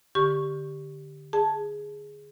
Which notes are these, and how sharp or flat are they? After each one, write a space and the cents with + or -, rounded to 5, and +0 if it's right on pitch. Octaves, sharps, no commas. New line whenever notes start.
D3 +0 G4 +0 C#6 +0
G#4 +0 A5 +0